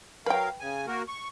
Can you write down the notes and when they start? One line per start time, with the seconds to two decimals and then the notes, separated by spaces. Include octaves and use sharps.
0.26 F#3 A#4 B4 F5 G5
0.60 C#3 G#5
0.87 A#3 F#4 A#4
1.08 C#6